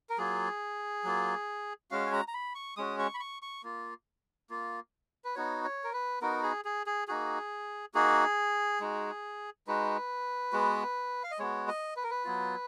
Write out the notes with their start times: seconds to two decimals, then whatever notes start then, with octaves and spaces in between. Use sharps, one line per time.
0.10 A#4
0.18 F#3 A#3 F4 G#4
1.04 F#3 A#3 F4
1.91 G#3 C#4 F#4 F5
2.06 G#5
2.13 A#5
2.28 A#5
2.34 B5
2.55 C#6
2.77 G#3 C#4 F#4 D#6
2.99 C#6
3.14 B5
3.20 C#6
3.42 C#6
3.64 A#3 F4
4.50 A#3 F4
5.24 B4
5.35 B3 D#4 F#4 C#5
5.65 C#5
5.84 A#4
5.93 B4
6.22 B3 D#4 F#4 A#4
6.43 G#4
6.65 G#4
6.87 G#4
7.08 A#3 D#4 F#4 G#4
7.94 A#3 D#4 F#4 G#4
8.80 G#3 D#4 F#4
9.67 G#3 D#4 F#4 B4
10.53 G#3 B3 F#4
11.24 F5
11.31 D#5
11.39 G#3 B3 F#4 C#5
11.68 D#5
11.96 B4
12.03 A#4
12.10 B4
12.25 F#3 B3 F4